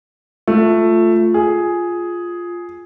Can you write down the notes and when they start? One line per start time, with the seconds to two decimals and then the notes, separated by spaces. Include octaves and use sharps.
0.48 A3 F4
1.34 G#4